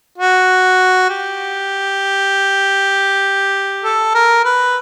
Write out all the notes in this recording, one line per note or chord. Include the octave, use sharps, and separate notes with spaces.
F#4
G4
A4
A#4
B4